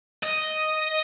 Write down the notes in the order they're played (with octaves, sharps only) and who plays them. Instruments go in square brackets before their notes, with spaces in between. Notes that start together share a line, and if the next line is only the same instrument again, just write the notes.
[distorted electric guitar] D#5